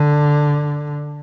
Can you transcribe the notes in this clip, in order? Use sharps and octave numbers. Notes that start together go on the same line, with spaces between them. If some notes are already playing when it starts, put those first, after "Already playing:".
Already playing: D3